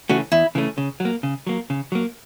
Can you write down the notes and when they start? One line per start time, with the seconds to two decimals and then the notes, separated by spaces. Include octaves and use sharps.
0.09 C#3 E3 A3 C#4 F#4
0.32 E2 E4
0.55 C#3 E3 A3 C#4
0.78 C#3
1.00 F#3
1.05 A#3
1.23 C#3
1.47 F#3 A#3
1.70 C#3
1.92 F#3 A#3